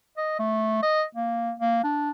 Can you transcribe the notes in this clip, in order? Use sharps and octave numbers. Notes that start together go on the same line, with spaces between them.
D#5
A3
D#5
A#3
A#3
D4